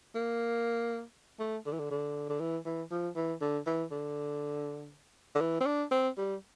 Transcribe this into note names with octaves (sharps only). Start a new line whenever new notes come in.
A#3
A3
D3
E3
D3
D3
D3
E3
E3
F3
E3
D3
E3
D3
D3
E3
C4
D4
C4
G3